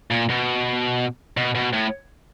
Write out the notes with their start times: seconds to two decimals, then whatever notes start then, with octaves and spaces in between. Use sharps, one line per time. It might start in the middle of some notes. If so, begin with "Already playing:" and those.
0.11 A#2
0.30 B2
1.37 B2
1.55 B2
1.73 A2